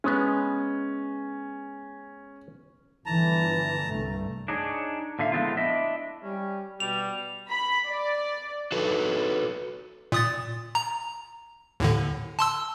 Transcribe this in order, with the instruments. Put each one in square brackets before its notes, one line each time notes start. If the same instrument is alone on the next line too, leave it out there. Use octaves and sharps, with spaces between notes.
[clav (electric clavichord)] G#3 B3 [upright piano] C#4
[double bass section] G1 D3 E3 [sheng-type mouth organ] A5 A#5
[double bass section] C2 G2 A3
[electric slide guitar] D4 D#4 G#4 C#5
A#2 D3 E5 F5
F3 G#3 A3 B3 E4 F4
D4 E4 D#5 E5
[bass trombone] G3 [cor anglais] C#4
[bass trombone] B2 [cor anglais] G3 [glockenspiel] F7
[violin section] B5
D5
[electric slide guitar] F#4 A4 B4
[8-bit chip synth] A#2 D#6 A6
A#5
D#2 A2 D3
A5 C6 E6